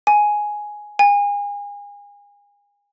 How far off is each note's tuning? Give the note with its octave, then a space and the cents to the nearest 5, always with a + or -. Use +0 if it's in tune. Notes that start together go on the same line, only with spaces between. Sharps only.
G#5 +5
G#5 -35